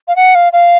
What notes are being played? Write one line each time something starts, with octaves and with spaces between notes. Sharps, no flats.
F5
F#5
F5
F5